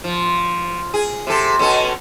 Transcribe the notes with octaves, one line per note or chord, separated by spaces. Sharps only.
F3
G#4
C3 A4
B2 C#4 A4